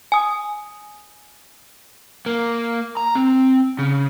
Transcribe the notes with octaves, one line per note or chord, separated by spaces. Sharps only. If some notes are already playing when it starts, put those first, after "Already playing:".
G#5 D#6
A#3
A#5
C4
C#3